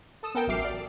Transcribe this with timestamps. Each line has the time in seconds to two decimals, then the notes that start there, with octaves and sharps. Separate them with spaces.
0.23 A4 D#6 E6
0.35 B3 A4 A#4 G5
0.47 A1 F#3 E5 D6 F6 C7
0.65 D5